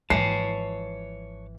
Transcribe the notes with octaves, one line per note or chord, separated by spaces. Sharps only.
G#1 E3 F3 C#5 A5 C7